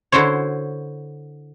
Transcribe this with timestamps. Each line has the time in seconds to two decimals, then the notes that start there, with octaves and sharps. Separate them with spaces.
0.12 D3 E4 F#4 C5 C#5